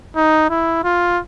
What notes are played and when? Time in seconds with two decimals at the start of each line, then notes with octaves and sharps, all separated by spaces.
0.16 D#4
0.50 E4
0.84 F4